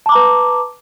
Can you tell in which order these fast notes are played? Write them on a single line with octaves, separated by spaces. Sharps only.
A5 D6 A#5 B4